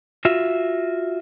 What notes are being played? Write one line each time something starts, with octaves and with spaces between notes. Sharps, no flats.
F4 F#4 E5